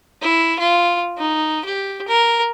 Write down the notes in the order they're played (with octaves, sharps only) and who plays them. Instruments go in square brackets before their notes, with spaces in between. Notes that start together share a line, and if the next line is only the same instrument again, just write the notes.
[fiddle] E4
F4
D#4
G4
A#4